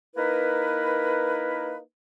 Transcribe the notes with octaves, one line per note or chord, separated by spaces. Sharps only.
A#3 D#4 E4 A#4 B4